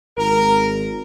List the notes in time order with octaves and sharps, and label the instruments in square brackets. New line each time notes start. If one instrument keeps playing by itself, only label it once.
[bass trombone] G#1 [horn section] A#4